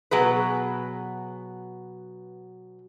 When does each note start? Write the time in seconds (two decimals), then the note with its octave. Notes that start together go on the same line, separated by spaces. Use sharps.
0.11 B2 F#3 G#4 B4